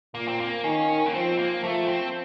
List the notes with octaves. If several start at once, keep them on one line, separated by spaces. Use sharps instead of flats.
A#2 A#3
C4
A#3
D#3 C#4
A#3
F3 C4
A#3
F3 A3
C4